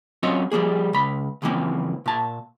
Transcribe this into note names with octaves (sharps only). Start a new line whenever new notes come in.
F#3 C4 C#4 F4 C#5 D#5
F3 G3 A#3 G#4
C#2 B5
C#2 F#2 E3 F3 A#3 C4
A#2 A5